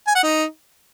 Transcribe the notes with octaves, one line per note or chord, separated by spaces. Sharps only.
G#5
F#5
D#4